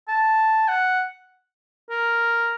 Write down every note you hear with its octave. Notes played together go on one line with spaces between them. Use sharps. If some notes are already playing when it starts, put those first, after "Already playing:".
A5
F#5
A#4